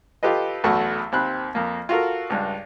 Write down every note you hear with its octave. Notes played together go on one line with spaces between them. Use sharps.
F4 G4 A4 B4 D#5
B1 E2 A3 F#4 F#5 A5
D#2 C4 B5 F#6
F2 A#3
F4 F#4 A4 A#4
C#2 G2